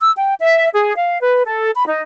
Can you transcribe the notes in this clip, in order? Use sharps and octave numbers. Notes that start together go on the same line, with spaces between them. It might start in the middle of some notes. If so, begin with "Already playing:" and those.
E6
G5
E5
G#4
F5
B4
A4
B5
D#4